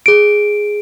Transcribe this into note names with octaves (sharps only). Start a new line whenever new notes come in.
G#4 D7